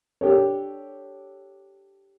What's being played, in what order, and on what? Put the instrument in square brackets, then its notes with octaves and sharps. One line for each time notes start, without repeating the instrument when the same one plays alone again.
[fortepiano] D4 G4 A4 C#5